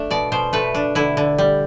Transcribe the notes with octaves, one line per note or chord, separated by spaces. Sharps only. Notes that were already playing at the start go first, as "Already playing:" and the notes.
Already playing: A3 D4
B2 D5
B2 C5
A3 B4
D4
D3 E4
D3
G3